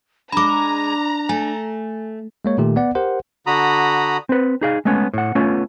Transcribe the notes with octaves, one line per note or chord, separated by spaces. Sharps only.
G#3 D4 G#4 A#5 B5 D6
A3 G#5
G#3 A#3 C#5
A#2 D#3 A3 G4
B3 D5 F#5
G4 A#4 C5 F#5
D3 F#4 A#5 B5 D#6
C4 B4
D#4 G#4 F5
G#3 A3 B3 C#4
A2 F#5
A3 B3 C#4 F4